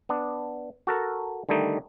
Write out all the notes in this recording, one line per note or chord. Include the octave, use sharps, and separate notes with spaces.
B3 D4
F#4 A4 A#4
D3 D#3 G3 A3 D#4